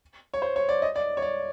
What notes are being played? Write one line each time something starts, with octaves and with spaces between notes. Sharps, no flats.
C#5
C5
C#5
D5
D#5
D5
C#5
D5